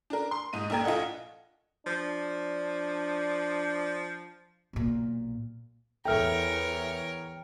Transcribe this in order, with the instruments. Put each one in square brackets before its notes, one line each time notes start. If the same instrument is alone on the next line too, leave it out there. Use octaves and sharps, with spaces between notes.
[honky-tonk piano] D4 A#4
C6
G#2 D#4 D#7
A#1 A#2 A#4 G5 G#6
A#1 F4 A4 D#5 F#5
[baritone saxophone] F3 [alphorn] D4
[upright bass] B1 A#2
[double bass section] E2 [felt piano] A4 E5 [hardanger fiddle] A#4 C#5 [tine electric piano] G5 F6